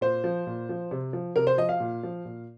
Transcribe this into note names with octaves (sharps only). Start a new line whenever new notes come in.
A#2 C5
F3
A#2
F3
C3
F3
C3 A#4
C5
F3 D#5
F5
A#2
F3
A#2